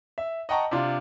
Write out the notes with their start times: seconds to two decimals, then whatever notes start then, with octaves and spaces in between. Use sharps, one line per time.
0.18 E5
0.49 D#5 F#5 G5 A5 A#5 C#6
0.71 C3 D4 F4